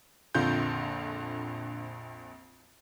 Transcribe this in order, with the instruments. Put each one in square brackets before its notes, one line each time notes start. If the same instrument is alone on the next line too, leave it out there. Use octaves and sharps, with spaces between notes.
[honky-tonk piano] A#1 F2 [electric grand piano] D3 F4 G6